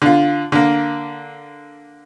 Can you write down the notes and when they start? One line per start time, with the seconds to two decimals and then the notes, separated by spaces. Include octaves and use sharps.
0.02 D3 F4
0.52 D3 A#3